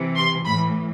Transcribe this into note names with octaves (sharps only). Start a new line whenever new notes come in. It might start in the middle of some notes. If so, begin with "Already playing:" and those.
Already playing: C3 E3
C6
A2 E3 B5